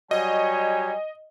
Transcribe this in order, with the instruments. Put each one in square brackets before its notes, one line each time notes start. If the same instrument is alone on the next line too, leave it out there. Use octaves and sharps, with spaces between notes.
[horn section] F#3 G3 C#5 [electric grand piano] D#5 [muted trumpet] G#5